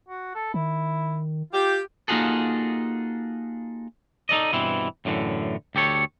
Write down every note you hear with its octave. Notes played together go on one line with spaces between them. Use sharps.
F#4
A4
D#3 E4
F4 G4
A#3 D#4 F4 F#4 G#4 A4
D#4 A4 D5 D#5
G2 B2 E3 C4 E4
F#2 A2 D3 E3
D2 G4 A4 C#5